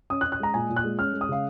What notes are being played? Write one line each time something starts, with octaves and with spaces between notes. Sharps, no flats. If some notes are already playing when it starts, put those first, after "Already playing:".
C#4 D#6
F#6
C#4
F#6
G#3 A#5
A#2 G#5
A#2
F#6
G#3
C#4 F6
G#3
D#6
C#3 F5